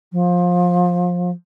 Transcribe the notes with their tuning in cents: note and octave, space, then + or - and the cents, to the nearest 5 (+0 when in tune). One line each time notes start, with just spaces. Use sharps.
F3 +20